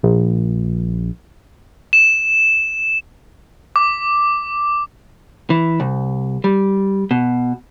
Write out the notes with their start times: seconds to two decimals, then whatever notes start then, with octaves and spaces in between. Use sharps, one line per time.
0.03 A#1
1.93 E7
3.76 D6
5.50 E3
5.80 C2
6.44 G3
7.11 B2